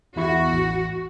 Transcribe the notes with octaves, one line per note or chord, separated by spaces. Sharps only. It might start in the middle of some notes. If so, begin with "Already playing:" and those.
E2 E4 F#4 C#6
A1